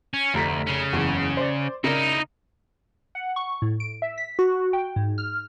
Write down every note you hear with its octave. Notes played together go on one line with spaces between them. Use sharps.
C#4
F1 D2 A#5 B6
C#3 C#4
F#1 E2
C5 D5
C#3 D#4 E4 A#4 D5
F#5
C#6
A2
D7
E5
B6
F#4
G5
G#2
F6